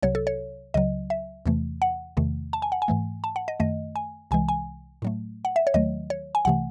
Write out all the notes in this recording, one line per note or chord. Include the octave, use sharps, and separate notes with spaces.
C2 C3 F#3 C#5
A4
C#5
C#2 C#3 F#3 D#5
E5
E2 C3 E3 A3
F#5
E2 C3 D#3 A3
A5
G#5
F#5
G#5
G#2 E3 A3
A5
F#5
D#5
F#2 D#3 A3 D#5
G#5
C2 C3 E3 G#3 G#5
G#5
A2 F#3 A3
F#5
E5
C#5
D#2 D#3 F#3 A3 D#5
C#5
G#5
C2 C3 E3 A3 F#5